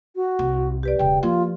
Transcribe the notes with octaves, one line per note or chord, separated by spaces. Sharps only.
F#4
C2
G4 B4 D5
E1 C#3 G5
F3 A#3 F4